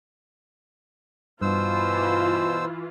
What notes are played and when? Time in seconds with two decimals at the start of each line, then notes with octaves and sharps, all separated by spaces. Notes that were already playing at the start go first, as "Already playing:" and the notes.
1.41 G2 B2 E3 F4 C5 E6